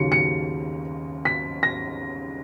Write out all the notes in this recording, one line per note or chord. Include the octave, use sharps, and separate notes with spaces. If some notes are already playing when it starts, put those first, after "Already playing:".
Already playing: D#2 C#3 F#3 C#7
C#7
B6
A#6